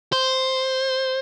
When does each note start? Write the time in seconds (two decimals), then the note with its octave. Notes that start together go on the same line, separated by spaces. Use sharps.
0.12 C5